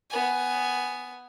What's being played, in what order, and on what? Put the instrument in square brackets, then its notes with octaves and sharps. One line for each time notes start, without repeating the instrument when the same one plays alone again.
[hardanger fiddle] B3 G#5